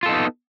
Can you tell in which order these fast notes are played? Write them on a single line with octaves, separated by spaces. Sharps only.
F4 A4 D#4 B3